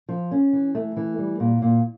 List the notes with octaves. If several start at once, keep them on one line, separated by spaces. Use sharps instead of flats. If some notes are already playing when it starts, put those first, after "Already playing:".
F3
C#4
E3
A3
E3
G3
A#2
A#2